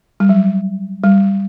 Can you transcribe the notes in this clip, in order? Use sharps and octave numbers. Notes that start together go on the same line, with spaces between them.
G3
F#3
G3